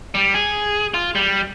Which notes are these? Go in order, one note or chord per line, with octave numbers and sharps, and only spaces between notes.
G3
G#4
F4
G3